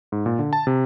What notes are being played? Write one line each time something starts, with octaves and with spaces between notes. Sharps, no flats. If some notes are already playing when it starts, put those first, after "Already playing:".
G#2
A#2
D3
A5
C3